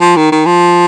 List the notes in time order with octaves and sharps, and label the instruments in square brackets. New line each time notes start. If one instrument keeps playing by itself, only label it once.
[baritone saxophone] F3
D#3
D#3
F3